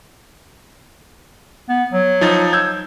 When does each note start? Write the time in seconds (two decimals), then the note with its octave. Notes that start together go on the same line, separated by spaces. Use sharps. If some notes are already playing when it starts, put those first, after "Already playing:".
1.69 B3
1.93 F#3
2.21 F3 D#4 A6
2.53 E6 G6 G#6